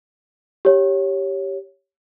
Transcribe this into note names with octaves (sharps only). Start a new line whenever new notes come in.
G4 C#5